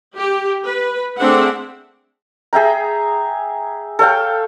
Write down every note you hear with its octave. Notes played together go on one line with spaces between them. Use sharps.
G4
B4
A3 C4 D4 G#4 E5 F#5
G#4 E5 G5 A#5
A4 C#5 F5 G5